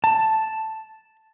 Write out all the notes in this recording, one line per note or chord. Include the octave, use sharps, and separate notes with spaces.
A5